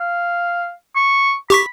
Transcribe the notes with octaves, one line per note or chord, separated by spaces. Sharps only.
F5
C#6
G4 B5 C#6 B6